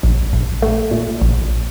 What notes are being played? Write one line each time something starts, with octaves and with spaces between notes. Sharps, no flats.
A#1
A#1
A3
A#2
A#1